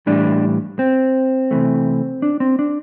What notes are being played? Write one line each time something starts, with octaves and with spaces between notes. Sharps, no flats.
A2 E3 G3 D4
C4
C3 E3 A3
D4
C4
D4